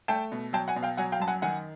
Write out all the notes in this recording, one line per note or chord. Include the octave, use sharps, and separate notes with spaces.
A3 G5 A5
B2
F#3 G5 A5
F#5 G#5
B2
F5 G5
F#3 F#5 G#5
F5 G5
F#2 A5
F#5 G#5
D#3 F#5 G#5